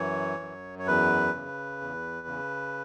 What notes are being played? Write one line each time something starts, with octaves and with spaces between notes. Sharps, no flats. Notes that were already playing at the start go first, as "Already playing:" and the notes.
Already playing: F#2 E3 C#5
F#2
C#5
E2 B4
C#3
E2
C#3